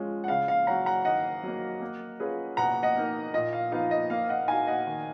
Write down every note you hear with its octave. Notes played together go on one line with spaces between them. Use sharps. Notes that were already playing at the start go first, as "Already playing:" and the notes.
Already playing: F3 G#3 C#4 F4
F#5
C#3 F5
F5
F#3 C#4 F#5 A#5
F#5 A#5
D#3 D#5 F#5
F#3 A#3
A#3
C#4 F4 G#4 B4
B2 F#5 A#5
D#5 F#5
A#3 D#4 A#4
A#2 D#5
F5
F3 B3 D#4 F5
D#5
A#3 F5
D#5 F#5
D#4 F#4 F5 G#5
D#5 F#5
D#3